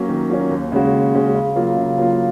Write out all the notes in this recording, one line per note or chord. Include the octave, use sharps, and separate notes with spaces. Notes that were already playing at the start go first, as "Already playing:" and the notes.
Already playing: F#3 A#3 C#4
D#3
F#3 A#3 C#4
D#2
C#3 G#3 C#4 F#4
D#2
C#3 G#3 C#4 F#4
C#3
F#3 A#3 F4
C#3
F#3 A#3 F4